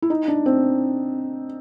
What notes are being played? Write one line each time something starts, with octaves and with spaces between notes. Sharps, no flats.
E4
D#4
D4
C4